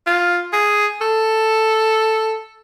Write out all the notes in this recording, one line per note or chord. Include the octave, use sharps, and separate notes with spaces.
F4
G#4
A4